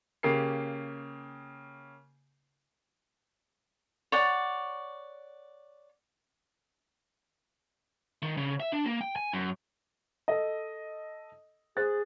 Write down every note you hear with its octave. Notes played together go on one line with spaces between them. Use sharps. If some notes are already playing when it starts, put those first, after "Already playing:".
C#3 A#3 G4 C7
C#5 D5 F#5
D#3
C#3
E5
D4
A#3
G5
G#5
F#2
A4 D#5
G#4 C5 F#6 A6